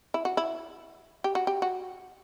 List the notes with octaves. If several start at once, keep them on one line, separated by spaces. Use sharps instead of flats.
E4
F#4
E4
G4
F#4
G4
F#4